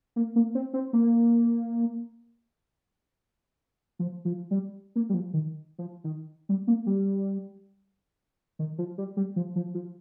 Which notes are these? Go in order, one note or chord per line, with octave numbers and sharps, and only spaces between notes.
A#3
A#3
C4
C4
A#3
F3
F3
G3
A#3
G3
F3
D#3
F3
D#3
G3
A#3
G3
D#3
F3
G3
G3
F3
F3
F3